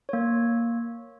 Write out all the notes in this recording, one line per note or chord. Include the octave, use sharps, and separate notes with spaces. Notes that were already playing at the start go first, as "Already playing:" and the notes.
A#3 C#5